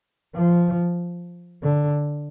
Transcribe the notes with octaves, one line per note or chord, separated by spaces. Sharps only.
F3
D3